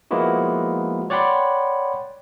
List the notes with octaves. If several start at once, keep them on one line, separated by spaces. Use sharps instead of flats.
F3 G#3 A#3 B3 E4 F#4
C#5 D5 F#5 G5 B5 C6